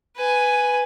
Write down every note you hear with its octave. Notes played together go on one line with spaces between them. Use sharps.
B4 G#5